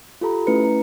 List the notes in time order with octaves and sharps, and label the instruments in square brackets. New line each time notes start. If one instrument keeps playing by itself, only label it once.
[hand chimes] F4 G4 A4 A#5 B5
A3 C#4 E4 B4 C#7
A#5